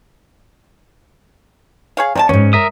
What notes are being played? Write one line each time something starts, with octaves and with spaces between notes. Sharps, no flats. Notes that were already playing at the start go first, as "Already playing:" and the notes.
G#4 C#5 F5
C3 C#4 D5 A5
D#2 G#2 C#4 C#5
A#4 E5 D#6